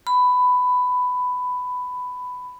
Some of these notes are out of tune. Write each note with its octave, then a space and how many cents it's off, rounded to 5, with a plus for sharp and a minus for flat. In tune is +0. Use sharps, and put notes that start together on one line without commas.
B5 +15